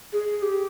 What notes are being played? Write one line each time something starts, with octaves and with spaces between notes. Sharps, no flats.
G#4
G4